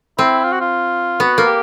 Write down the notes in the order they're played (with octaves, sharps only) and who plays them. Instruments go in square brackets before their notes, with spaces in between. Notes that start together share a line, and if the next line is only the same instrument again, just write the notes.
[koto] C4 [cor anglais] E4
[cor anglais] F4
F#4
F4
[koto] B3 [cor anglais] F#4
[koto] A#3
[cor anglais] G4